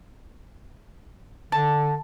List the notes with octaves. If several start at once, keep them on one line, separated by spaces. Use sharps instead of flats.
D3 A5